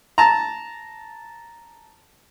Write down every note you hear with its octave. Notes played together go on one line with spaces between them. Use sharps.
A5 A#5